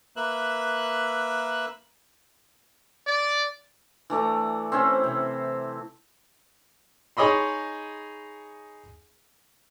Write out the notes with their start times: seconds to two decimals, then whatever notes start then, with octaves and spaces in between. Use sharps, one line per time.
0.16 A#3 B4 E5 F#6
3.07 D5
4.10 E3 A3 D5 A#5
4.72 C4 C#4 E4 C5
5.04 C3
7.17 D#4 G#4 C#5 D#5 B5 C6